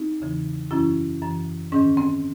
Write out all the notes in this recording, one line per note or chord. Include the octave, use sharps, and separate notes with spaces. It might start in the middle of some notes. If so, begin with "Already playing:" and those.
Already playing: C4 D#4
E2 C#3 E3
F#2 E3 C#4 E4
F#2 E3
G#2 D#3 C#4
C4